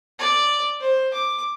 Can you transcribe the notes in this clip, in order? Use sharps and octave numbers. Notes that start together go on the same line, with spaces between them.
D5
C5
D6